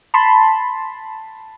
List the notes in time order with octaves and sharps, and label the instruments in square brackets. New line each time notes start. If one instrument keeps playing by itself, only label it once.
[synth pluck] A5 B5 C6